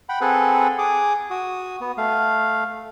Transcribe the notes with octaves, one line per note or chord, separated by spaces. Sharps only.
F#5 G5 B5
C4 G#4 A4 B4 F#5
G#4 D6 D#6
F#4 D#6
B3
A3 F5